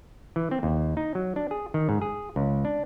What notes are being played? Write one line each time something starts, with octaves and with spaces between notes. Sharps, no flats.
E3
C4
D#2
D#4
F#3
D4
G#4
D#3
G#2
G#4
C#2
D4